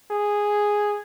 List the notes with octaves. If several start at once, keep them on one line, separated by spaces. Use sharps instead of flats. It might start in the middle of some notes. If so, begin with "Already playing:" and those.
G#4